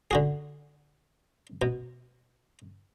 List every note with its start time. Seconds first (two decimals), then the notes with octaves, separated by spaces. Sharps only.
0.11 D3 F#4 G#4
1.62 B2